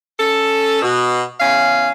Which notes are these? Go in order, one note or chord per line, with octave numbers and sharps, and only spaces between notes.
C#4 A4
B2
E2 C#4 F5